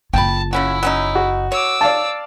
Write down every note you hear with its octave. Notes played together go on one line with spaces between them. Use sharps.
F#1 F4 G5 A5 B5
C#3 C#4 E4 F#4
F#3 C#4 D#4
F#4
C#5 D6 E6
D5 F5 A5